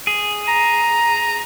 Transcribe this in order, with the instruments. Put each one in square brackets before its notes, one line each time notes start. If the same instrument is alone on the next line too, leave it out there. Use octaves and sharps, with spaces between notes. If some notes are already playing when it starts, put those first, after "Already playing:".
[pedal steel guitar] G#4
[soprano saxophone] A#5